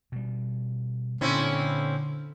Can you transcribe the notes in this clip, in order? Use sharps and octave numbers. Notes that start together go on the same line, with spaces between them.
B2 G3
A#2 D3 C4 C#4 E4